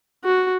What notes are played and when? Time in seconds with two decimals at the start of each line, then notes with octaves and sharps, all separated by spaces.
0.25 F#4